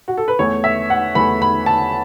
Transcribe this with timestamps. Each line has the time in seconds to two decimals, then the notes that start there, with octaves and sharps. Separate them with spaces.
0.08 F#4
0.17 A4
0.28 B4
0.39 E2 E3 A3 C#5
0.64 E5
0.90 F#5
1.15 E2 E3 A3 B5
1.42 B5
1.66 A5